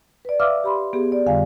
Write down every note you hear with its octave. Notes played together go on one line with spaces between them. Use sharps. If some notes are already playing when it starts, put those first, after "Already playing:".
B4 D5
B4 E5 F5 D6 E6 F6
G4 B5 C6
B3 G4 G#4
D5
F2 D3 G3 F5 G#5